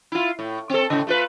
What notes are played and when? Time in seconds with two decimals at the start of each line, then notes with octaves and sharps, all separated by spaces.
0.12 E4 F4
0.39 A2
0.70 C4 A4
0.90 A2 C#3
1.07 A3 F4 B4